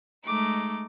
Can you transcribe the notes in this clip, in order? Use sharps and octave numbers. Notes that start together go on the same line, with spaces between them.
G#3 A3 D#4 D6